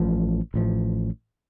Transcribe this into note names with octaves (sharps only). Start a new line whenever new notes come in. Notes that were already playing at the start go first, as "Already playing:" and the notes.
Already playing: A1 A2 F3
A1 A2 F3